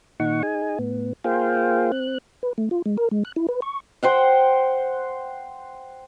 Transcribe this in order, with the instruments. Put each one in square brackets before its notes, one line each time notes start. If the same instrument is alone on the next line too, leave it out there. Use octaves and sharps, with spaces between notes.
[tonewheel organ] A#2 D#3 D#4 F#5 C#6
D#4 G#4 G#5
A2 B3
A#3 F4 G#4 C5 F5 G5
C4 F#6
B4
A3
F4
G#3
A#4
G#3
F#6
E4
B4
C#6
[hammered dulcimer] C5 F#5 G5